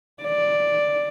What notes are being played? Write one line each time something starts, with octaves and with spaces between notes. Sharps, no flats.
D5